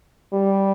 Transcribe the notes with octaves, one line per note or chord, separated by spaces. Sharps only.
G3